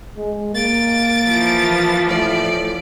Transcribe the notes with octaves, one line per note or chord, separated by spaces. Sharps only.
G#3
A#3 A6 D7
E3 F3
A2 D5